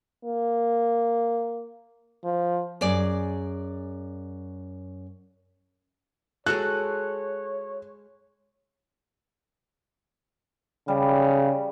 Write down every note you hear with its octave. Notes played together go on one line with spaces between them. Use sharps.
A#3
F3
F#2 G#4 D5
G#3 F#4 A4 C#5 F#6
C#3 G3